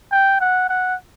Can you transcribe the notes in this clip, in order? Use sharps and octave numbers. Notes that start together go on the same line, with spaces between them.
G5
F#5
F#5